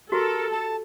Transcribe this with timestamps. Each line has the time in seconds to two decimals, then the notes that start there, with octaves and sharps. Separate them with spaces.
0.12 F#4 G4 A4 A#4
0.51 A5